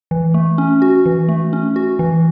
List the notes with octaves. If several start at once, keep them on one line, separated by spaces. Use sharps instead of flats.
E3
A3
C#4
F#4
E3
A3
C#4
F#4
E3